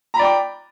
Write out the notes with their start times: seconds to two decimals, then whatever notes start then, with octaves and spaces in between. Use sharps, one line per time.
0.14 A#5
0.16 B5
0.19 D5
0.22 G5
0.24 D6